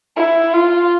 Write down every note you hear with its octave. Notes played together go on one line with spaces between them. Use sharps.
E4
F4